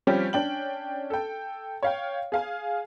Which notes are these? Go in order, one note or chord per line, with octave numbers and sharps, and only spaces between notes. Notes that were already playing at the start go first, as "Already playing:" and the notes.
F3 G3 C4 C#4 G4
C#4 D4 G5 F#7
A4 G5
C#5 F5 G5
G#4 F5 G#5